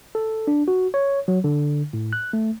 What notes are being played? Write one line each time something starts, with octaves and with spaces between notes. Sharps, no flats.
A4
D4
F#4
C#5
F#3
D3
A2
F#6
A3